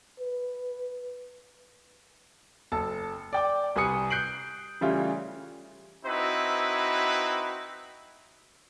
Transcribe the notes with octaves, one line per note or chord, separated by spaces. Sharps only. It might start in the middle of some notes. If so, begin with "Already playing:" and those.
B4
F#1 A4 A5
D5 G5 D6
C2 B4 G#5 D#6 C#7
F#6 G6 C7 D7 F#7
C#3 E3 G3 A3 C#4 F4
C4 D#4 E4 F#4 B4